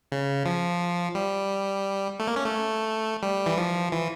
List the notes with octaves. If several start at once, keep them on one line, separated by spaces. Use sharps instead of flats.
C#3
F3
G3
A3
A#3
C#4
A3
G3
E3
F3
E3